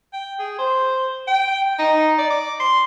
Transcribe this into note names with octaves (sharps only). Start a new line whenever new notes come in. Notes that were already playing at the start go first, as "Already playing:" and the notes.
G5
G#4
C5
G5
D#4
D5
D6
C6